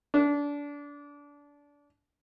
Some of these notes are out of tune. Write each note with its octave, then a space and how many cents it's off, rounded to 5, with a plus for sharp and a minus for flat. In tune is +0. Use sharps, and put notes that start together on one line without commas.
D4 -25